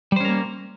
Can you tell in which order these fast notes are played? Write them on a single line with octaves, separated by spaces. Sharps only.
G3 C5 C#4 A#4 A#3